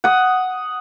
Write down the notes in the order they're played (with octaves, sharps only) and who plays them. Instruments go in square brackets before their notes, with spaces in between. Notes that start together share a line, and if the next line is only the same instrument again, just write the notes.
[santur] F#5 D#6